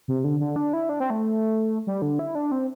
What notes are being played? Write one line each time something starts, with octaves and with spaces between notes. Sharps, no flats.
C3
D3
D3
D4
E4
D4
C4
A3
G3
D3
E4
D4
C4